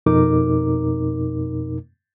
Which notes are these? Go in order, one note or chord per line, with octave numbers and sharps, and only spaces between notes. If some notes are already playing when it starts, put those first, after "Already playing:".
F2 B2 D#4 A#4 D6